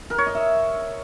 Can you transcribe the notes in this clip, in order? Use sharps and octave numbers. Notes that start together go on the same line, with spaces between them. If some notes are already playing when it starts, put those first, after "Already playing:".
A#4
C#5
D#5
E5